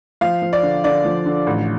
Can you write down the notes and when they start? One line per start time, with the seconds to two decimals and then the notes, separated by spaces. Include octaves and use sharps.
0.21 F3 F5
0.42 F3
0.53 D5
0.63 D3
0.84 D3 D5
1.05 F3
1.26 D3
1.47 A1